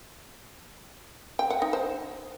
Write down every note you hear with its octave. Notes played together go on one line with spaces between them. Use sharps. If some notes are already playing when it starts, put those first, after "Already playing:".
G5
F#5
D#4
C5